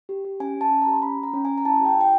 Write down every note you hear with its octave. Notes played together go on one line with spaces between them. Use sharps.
G4
G4
C#4 G#5
C#4
A5
C#4
G4 A#5
C6
C#4 B5
C#4
A#5
C#4
C#4 G#5
A#5
E4 A5
G4 G5
E4
G5